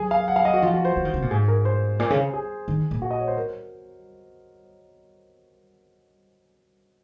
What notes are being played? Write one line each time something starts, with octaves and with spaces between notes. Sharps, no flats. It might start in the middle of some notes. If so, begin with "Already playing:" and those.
Already playing: F#3 G#4
F5
F#5
F5
D#5
F#4
F3 F4
F#4
C5
F3
D#3
C3
A#2
G#2 G#4
A#4
C5
A#2
C#3
G#4
D#3
A#2
F#4
D#5
C#5
C5
A#4